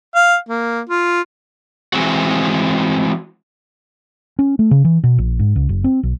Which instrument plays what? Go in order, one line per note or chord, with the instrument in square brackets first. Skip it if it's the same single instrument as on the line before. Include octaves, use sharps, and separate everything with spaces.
[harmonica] F5
A#3
F4
[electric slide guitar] E3 G#3 C4 F#4
[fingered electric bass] C#4
A3
C#3
E3
B2
A#1
G#2
C#2
F#1
C4
B1